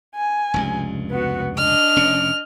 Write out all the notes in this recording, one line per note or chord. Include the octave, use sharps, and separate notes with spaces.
G#5
F1 C#2 G2
B3 F#4
D4 D#5 F6
F1 C#3 C#4